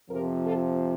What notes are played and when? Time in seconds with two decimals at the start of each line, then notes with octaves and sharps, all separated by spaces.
0.11 F2 C3 F3 G4 A#4
0.43 F4 A4